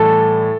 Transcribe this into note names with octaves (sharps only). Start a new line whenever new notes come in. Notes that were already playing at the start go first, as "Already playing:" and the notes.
Already playing: A2 E3 G3 A4